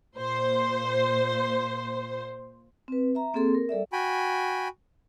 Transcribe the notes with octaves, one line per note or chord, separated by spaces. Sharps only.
A#2 C5
C4 B4
E5 A#5
A#3 C4 G#4 A4 C6
A#4
G3 A4 D5 E5
F#4 G5 G#5 B5